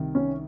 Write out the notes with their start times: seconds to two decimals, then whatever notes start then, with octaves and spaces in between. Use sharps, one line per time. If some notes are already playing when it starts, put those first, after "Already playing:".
Already playing: C2 C3 D#3
0.15 C#4